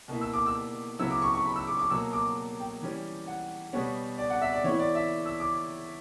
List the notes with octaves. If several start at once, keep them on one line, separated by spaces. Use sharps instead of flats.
B2 A#3 E4
E6
D6
E6
C#3 F#3 B3 E4 E6
D6
C#6
C#6
B5
E6
D6
D6
B2 F#3 A#3 E6
D6
G5
E3 G3 C#4
F#5
B2 G3 B3 C#5
D5
F#5
E5
D5
E3 B3 E4 C#5
D5
E5
E6
D6